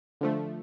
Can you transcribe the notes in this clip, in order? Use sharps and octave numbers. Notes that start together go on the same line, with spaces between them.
D3 F3 A3